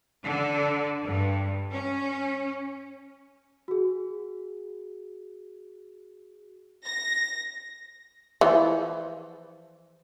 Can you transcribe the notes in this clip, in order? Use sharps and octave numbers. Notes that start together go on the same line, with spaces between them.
D3
G2
C#4
F#4 G#4
A#6
E3 F3